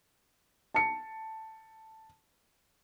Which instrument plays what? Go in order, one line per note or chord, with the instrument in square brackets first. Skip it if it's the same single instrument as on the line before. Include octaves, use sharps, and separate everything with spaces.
[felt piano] A5 C#7